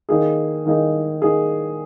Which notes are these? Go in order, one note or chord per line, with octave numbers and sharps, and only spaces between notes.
D#3 A#3 D#4 G#4
D#3 A#3 D#4 G#4
D#3 A#3 D#4 G#4